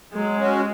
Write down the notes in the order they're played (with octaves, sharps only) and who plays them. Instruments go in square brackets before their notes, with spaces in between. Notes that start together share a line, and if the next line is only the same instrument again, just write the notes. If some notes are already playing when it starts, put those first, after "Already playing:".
[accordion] F#3 [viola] G#3
[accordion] C#4 F#4